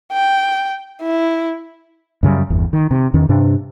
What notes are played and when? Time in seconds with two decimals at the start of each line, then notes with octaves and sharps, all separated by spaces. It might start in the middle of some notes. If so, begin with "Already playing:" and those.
0.13 G5
1.02 E4
2.23 F#2 C#3 F#3 G3
2.50 G1 E2
2.73 D#3
2.91 C3
3.14 E2 D#3 C#4
3.29 G2 C3 D4